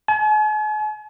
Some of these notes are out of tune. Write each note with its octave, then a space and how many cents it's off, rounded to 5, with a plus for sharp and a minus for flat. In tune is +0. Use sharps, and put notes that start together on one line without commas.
G#5 +45